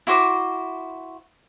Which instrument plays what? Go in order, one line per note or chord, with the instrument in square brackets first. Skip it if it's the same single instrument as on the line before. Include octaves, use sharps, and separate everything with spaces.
[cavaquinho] E4 F#4 C5 D6